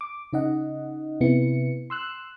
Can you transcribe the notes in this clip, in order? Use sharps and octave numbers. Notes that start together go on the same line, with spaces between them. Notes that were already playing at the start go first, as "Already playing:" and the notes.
D6
C#3 D#4 D#5 F#5
C3 B3 E4 C#7
C6 E6 F#6